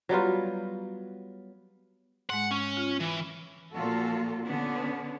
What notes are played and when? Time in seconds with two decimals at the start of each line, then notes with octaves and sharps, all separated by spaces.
0.09 F#3 G3 B3 F4
2.30 G#2 G#3 F#5
2.51 C#4 C#6
2.77 F4
3.00 E3
3.73 A#2 F3 F4 F#4 A4
4.46 D3 B3 C#4 D4